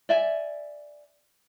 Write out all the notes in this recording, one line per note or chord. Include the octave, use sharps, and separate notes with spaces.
D5 E5 G#5